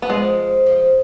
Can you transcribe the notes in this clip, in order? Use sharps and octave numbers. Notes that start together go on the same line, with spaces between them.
B3
F3 G#3
F3